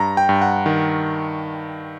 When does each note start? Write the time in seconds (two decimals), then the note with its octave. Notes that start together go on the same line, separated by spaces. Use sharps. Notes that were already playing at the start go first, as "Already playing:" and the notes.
Already playing: G2 A#5
0.17 G5
0.29 G2
0.42 F#5
0.66 D#3